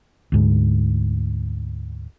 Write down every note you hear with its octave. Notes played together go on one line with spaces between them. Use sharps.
D2 G#2